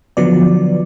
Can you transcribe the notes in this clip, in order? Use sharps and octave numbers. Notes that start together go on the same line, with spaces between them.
D3 F3 F#3 B3 D5